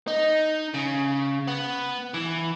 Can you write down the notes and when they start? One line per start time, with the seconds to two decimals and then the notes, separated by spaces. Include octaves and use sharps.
0.08 D#4
0.74 C#3
1.47 B3
2.14 E3